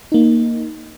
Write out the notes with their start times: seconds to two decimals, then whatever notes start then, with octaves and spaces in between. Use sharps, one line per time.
0.12 A#3 D#4